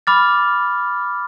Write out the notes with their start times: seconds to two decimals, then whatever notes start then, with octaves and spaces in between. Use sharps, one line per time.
0.07 B5 D6 F6 A6